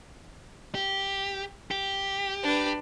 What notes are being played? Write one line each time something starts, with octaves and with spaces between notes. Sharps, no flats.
G4
G4
D4 B4